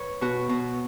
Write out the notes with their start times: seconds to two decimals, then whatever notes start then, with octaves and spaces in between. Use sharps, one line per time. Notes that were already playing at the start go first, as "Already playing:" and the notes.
Already playing: B4 C#5
0.21 B2 F#4
0.49 B2